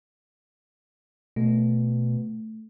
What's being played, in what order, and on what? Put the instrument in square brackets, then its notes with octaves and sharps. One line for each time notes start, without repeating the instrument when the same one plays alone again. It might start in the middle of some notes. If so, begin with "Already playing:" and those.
[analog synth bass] B2 [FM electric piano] A3